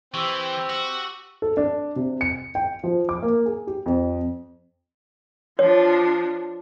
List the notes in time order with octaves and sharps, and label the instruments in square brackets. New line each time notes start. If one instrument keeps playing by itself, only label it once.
[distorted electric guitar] E3 [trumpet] C4 [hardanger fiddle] G4 [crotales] C#6 E6
[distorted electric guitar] F#4 [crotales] E6
[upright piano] A4
D4
C3
C#7
G5
F3
D6
A#3
G#4
G4
F2
[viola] F3 D4 [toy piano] C#5